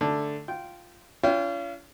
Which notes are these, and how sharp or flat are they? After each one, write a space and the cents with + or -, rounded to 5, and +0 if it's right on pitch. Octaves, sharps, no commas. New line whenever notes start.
D3 +0 A3 +0
F4 +0 G5 -15
C#4 +40 F4 -35 G5 +0